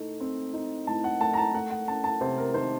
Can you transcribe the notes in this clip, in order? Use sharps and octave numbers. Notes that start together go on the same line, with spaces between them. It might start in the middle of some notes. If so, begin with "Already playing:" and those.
Already playing: A2 A3 D#4
C4
D#4
A2 A5
F#5
A3 A5
A#5
A5
A3 F#5
F#5
C#4 A5
A5
C3 C5
A#4
D#3 C5